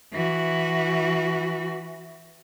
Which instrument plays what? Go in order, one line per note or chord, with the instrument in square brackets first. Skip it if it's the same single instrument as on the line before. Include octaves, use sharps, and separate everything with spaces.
[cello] E3 F#4